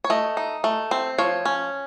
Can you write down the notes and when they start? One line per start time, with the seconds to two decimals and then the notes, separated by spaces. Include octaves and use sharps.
0.04 C#5
0.10 A3 D#5
0.37 D#4
0.64 A3
0.91 C4
1.18 F3 C#5
1.45 C#4